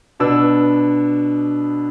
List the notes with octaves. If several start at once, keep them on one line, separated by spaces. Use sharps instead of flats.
B2 B3 D4 E6